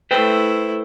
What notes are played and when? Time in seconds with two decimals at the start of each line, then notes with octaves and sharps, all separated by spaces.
0.11 A3 E4 B4 C5 G5